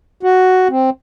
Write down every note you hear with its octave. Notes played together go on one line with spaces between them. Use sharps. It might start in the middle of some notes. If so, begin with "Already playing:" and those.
F#4
C4